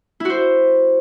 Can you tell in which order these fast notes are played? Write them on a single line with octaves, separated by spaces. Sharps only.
E4 F#4 C5